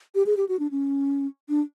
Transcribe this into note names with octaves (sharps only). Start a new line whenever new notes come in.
G4
G#4
G4
F#4
D4
C#4
D4